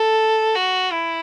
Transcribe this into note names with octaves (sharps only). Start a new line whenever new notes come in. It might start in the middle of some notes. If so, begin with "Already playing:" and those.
Already playing: A4
F#4
E4